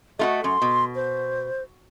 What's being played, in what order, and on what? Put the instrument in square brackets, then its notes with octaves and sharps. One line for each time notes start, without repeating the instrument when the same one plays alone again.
[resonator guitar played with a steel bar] A3 F4 F#4 [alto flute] D#5
[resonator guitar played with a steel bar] F#2 [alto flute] C6
[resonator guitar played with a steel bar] B2
[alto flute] C5